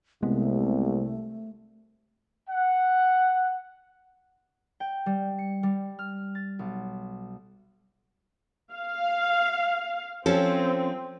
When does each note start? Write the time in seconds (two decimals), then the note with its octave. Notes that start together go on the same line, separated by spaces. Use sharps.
0.23 C2 C3 G#3 A3 B3
2.48 F#5
4.80 G5
5.06 G3
5.38 C#7
5.63 G3
5.99 F6
6.35 A6
6.59 B1
8.73 F5
10.26 F3 C4 C#4 A4